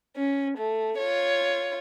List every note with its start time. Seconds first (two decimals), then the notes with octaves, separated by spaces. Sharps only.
0.16 C#4
0.57 A3
0.97 F4 C#5